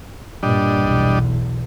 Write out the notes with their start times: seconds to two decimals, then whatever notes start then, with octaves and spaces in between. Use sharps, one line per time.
0.43 G2 A#2 G3 D4 D#5
0.80 B1 E2